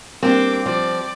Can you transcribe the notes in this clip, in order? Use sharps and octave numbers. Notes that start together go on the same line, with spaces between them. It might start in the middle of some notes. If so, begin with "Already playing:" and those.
G3 A#3 C4 D4 G4 D6
F3 D5